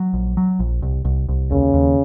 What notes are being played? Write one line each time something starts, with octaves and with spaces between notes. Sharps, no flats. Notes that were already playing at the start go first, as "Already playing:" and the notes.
Already playing: F#3
A#1
F#3
A#1
C2
C2
C2
D#2 C#3
D#2